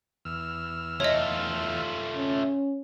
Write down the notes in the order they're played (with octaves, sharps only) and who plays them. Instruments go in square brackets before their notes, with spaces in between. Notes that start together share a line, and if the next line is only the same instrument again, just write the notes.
[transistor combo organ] E2 E6 F6
[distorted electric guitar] A3 F4 [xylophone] C#5 D#5
[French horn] C#4